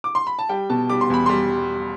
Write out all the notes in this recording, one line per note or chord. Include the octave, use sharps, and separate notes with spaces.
D6
C6
B5
A5
G3 G5
B2 A5
G3 D6
C6
E2 B5
G3 C6